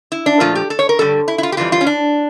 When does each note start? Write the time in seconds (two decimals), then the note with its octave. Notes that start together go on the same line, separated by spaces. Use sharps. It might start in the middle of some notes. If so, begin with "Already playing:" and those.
0.12 E4
0.26 D4
0.40 A#2 F3 A3 F4
0.55 G4
0.70 A4
0.79 C#5
0.89 A#4
0.99 G2 D3 G3 A4
1.28 E4
1.38 E4
1.43 F4
1.52 G4
1.57 F2 E3 G3 F4
1.72 F4
1.81 C#4
1.86 D4